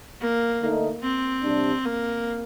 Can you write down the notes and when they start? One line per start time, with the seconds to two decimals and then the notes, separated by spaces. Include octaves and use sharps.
0.20 A#3
0.61 D3 A3 D#4
1.02 C4
1.44 C3 G3 D4
1.85 A#3